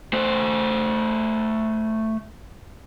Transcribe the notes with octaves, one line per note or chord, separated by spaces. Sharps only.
A3 C5